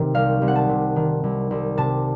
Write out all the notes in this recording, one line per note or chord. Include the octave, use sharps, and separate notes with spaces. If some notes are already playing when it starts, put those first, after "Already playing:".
Already playing: C3 D#3
C2 F5
C2
F#5
A5
C3
D#3
C2
C2
C3 A5